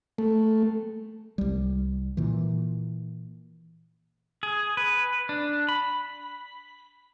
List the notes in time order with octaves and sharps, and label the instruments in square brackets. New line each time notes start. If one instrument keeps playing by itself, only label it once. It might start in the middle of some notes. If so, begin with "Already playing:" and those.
[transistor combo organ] A3
[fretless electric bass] C2 G3
A#2 E3
[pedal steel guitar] G#4
B4
D4
B5